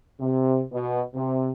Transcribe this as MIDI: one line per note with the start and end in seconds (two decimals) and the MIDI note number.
0.20 0.62 48
0.73 1.01 47
1.15 1.51 48